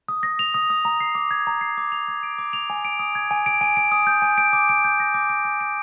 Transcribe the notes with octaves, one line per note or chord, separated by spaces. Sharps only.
D#6
A#6
F7
D#6
D#6
A#5
C7
D6
G#6
A#5
C7
D6
F7
G#6
D7
D6
F7
G#5
D7
D#6
G#6
G#5
D7
G#5
D7
D#6
G6
G#5
D7
D6
D7
G6
A#6
D6
D7
G#5
D7